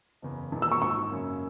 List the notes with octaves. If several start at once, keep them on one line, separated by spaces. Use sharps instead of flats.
F#1 E2 C#3
E1 E2 D#3
E6
C#6
G#1 G#2 D#3 C#6
F#2 C#3 F#3 A#3 C#4